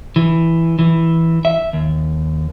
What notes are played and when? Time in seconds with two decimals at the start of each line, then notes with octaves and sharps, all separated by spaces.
0.16 E3
0.79 E3
1.45 E5
1.73 D#2